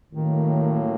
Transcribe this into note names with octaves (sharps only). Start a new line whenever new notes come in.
A1 A2 D#3 F#3 A#3